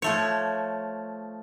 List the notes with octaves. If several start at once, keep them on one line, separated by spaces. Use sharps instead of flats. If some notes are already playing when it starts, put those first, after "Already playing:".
F3 A3 C#5